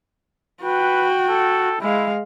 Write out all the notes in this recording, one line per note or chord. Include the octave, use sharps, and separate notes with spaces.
F#4 B4 G5
A4
G#3 E4 F5